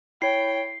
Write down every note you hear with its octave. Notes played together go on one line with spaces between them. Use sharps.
E4 C#5 G5 C7